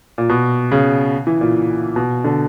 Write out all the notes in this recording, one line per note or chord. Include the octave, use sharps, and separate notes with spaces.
A#2
B2
C#3
E3
A#2
B2
D3